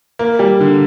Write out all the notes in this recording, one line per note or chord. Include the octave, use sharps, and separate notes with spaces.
A#3
G3
D3